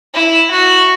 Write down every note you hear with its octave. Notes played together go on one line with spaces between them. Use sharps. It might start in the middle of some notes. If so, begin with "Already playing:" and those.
E4
F#4